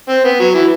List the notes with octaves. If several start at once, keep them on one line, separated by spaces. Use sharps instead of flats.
C4
B3
F#3
E3